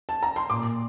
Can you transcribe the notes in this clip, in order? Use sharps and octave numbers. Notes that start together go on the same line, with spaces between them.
A5
A#5
C6
A#2 D6